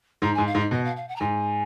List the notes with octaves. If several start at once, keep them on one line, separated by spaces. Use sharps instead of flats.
G#2 A#5
G#2 G#5
F5
G#2
D#5
B2 D#5
F5
F5
F#5
A#5
G#2 G#5